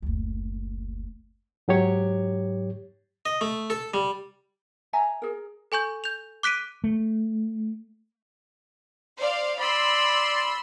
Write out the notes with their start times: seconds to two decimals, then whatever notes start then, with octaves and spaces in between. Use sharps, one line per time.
0.02 F#1 D2
1.68 G#2 F#3 G4 C#5
3.26 D#5
3.41 A3
3.70 A4
3.94 G3
4.93 E5 G#5 A#5
5.22 G#4 A#4
5.72 A4 G#5 C#6 G6
6.04 G6 F7
6.43 D6 F#6 B6 D7 D#7
6.84 A3
9.17 C5 D5 F5
9.59 D5 B5 C6 E6